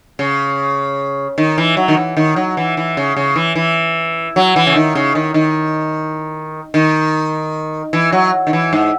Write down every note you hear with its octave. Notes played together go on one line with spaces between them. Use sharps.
C#3
D#3
E3
F#3
D#3
E3
D#3
F#3
E3
E3
C#3
C#3
E3
E3
F#3
E3
C#3
D#3
C#3
D#3
D#3
D#3
E3
F#3
D#3
E3
G#2